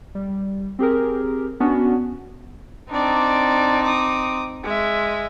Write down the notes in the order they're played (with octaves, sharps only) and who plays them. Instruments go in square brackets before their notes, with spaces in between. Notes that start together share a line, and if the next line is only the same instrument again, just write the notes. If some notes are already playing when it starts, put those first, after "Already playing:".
[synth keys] G3
C4 G4 G#4 A#4
B3 C#4 D4 F#4
[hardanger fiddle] C4 D#4 [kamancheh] D4 D5
[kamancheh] D6 D#6
G#3 E5